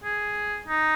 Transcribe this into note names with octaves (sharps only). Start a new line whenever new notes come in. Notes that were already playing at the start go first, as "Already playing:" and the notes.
G#4
D#4